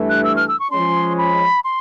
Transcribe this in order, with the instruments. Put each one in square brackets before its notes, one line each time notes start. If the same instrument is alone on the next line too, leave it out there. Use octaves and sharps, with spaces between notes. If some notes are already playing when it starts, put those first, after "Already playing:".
Already playing: [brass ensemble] G2 E3 A3
[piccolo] F#6
E6
F6
E6
C#6
[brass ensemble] F3 G#3 C#4 [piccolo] C6
[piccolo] B5
C6